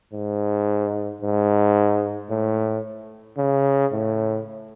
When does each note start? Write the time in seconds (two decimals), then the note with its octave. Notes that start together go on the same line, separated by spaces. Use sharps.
0.13 G#2
1.22 G#2
2.30 A2
3.38 C#3
3.92 A2